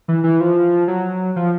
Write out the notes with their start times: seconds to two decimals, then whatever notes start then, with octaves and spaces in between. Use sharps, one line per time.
0.08 E3
0.24 E3
0.41 F3
0.88 F#3
1.36 F3